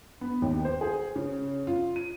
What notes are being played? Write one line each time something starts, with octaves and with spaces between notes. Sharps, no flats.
B3
D#2
C5
G#4
C#3
F4
D#7